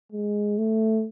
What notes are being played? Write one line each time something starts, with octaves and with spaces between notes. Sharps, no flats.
G#3
A3